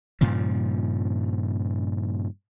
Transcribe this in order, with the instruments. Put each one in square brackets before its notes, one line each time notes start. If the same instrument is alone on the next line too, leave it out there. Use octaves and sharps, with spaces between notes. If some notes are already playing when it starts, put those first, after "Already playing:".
[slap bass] G2 A#2 C#3 F3